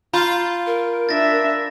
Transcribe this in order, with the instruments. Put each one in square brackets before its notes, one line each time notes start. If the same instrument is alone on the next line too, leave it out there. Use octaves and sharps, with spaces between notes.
[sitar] F4 [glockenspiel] A#5 B5 G6
[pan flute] A#4
[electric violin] D4 E5 [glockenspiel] A6 A#6